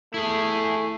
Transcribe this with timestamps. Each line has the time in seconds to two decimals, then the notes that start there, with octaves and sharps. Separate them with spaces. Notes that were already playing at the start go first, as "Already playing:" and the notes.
0.14 A3 E4 G#4